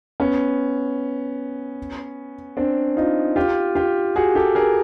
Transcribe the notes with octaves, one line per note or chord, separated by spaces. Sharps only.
B3 C#4
C4 D4
D#4 F4
F4 G4
F4 G4
F#4 G#4
G4 A4
G#4 A#4